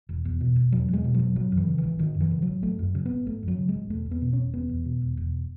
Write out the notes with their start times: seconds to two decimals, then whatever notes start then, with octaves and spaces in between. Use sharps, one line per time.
0.09 E1
0.25 E2
0.41 B2
0.56 E1
0.72 E1 F#3
0.89 E2 G#3
1.04 B2
1.14 E1 F#3
1.36 G#1 F#3
1.52 F#2
1.57 E3
1.68 C#3
1.78 E3
1.83 G#1
1.99 G#1 D#3
2.15 F#2
2.21 E3
2.31 C#3
2.42 F#3
2.47 G#1
2.63 G#1 A3
2.79 F#2
2.95 C#3
3.06 B3
3.11 G#1
3.27 G#1 A3
3.43 F#2
3.48 F#3
3.58 C#3
3.69 G#3
3.74 G#1
3.90 E1 A3
4.06 E2
4.11 B3
4.22 B2
4.33 E1 C#4
4.53 E1 B3
4.69 E2
4.85 B2
5.02 E1
5.17 E1